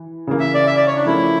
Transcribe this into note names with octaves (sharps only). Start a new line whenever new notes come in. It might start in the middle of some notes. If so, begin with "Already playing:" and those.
Already playing: E3
C#3 E3 A#3
E5
D5
E5
D5
C#5
D4
F3 A3 C#4 E4 G4 A#4